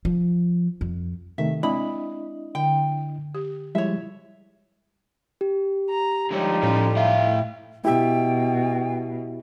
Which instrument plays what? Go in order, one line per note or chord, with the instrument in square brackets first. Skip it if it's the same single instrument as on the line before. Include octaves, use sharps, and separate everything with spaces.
[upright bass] F3
F2
[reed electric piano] C3 D#3 A3 [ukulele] E5
[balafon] G#3 C4 [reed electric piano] D4 E4 D#5 [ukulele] B5
[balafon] D3 [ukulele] G5
[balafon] G4
[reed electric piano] F3 G3 G#3 [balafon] E4 [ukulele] C#5 E5
[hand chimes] G4
[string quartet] A#5
[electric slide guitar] D3 G#3 C#5 [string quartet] F3 G3 D#4
[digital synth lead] A2 [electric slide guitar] C#4 F4
[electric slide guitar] E4 F5 [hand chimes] E5 G5
[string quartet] B2 [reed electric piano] E4 G4 E5 [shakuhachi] G5